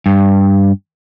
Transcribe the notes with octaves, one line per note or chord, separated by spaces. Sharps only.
G2